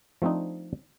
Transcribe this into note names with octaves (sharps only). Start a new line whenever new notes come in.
F3 A3 C4 D4 D#4